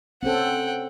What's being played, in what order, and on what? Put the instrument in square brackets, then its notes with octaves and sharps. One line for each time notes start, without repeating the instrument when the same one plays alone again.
[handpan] C4 C#4 A4 [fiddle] F#5 G5